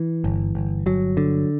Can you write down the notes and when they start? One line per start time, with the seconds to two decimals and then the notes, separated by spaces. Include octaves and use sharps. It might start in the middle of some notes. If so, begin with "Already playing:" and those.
Already playing: E3
0.24 G1
0.55 G1
0.86 G1 F#3
1.17 D3